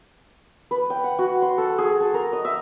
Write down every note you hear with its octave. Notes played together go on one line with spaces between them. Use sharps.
B4
G5
F#5
F#4
C6
A4
G#4
A4
A#4
D#5
E5